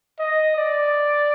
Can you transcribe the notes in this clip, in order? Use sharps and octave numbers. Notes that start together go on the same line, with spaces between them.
D#5
D5